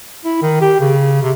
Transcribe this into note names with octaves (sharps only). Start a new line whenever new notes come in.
E4
D#3
G4
C#3
C3